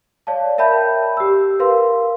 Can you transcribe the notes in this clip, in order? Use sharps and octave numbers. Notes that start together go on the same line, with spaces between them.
C#5 D5 F5 A5
A#4 E5 G5 A5 B5 G6
G4 E6
A#4 B4 F5 C6